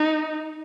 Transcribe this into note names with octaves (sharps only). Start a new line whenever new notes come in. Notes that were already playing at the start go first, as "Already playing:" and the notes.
Already playing: D#4